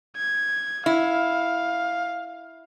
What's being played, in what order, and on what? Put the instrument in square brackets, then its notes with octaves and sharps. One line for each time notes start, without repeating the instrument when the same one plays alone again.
[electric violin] G#6
[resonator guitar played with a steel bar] E4 [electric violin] F5